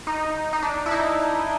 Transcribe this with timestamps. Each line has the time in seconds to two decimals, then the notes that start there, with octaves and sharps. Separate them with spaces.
0.07 D#4
0.53 D#4
0.63 D4
0.86 E4
0.91 D#4